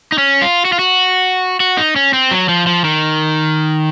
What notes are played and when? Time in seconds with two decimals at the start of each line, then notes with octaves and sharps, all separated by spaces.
0.12 D#4
0.18 C#4
0.42 F4
0.65 F#4
0.73 F4
0.79 F#4
1.60 F#4
1.78 D#4
1.96 C#4
2.13 C4
2.31 F#3
2.49 F3
2.67 F3
2.84 D#3